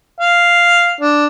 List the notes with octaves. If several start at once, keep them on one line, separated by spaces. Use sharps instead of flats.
F5
D4